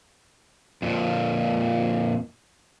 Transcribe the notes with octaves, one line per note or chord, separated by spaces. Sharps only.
F2 A#2